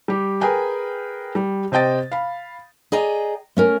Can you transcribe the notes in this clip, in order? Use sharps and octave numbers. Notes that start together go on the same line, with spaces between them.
G3 G4
G#4 A#4 B4 G5 G#5
G3
C3 C4 D#5 G5 A6
F5 B5
G#4 D5 D#5 G5 A#5
A3 C#4 A#4